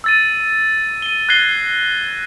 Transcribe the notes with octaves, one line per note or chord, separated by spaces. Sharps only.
E6 A6 D#7
D#7 G7
F#6 G#6 A#6 C7 G7